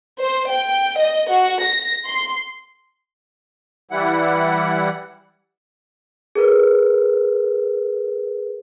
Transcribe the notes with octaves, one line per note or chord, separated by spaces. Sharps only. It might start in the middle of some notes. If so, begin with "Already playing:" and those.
C5
G5
D#5
F#4
A#6
C6
E3 G3 E4 F#5
G#4 A#4 B4